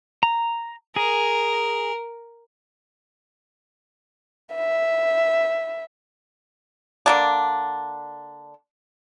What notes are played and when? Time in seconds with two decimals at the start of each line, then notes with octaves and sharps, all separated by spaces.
0.23 A#5
0.96 G#4 A#4
4.54 E5
7.06 D3 A#3 D4